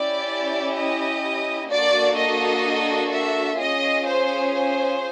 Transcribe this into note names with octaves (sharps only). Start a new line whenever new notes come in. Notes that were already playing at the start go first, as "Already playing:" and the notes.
Already playing: C#4 E4 G4 D5
D#5
A#3 D4 F#4 A4 D5
D#5
E5
C#4 F4 G#4 D#5
C5
C5